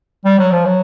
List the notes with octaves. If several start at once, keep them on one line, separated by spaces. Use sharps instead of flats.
G3
F#3
F3
F#3